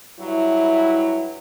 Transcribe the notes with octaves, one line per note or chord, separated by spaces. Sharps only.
G2 F#3 E4